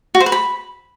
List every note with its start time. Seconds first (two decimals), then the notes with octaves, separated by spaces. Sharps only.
0.15 F#4
0.20 C5
0.26 B4
0.32 B5